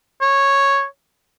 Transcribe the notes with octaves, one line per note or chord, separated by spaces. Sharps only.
C#5